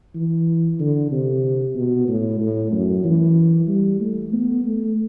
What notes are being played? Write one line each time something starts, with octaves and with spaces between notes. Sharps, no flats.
E3
D3
C3
B2
A2
A2
F#2
E3
G3
A3
B3
A3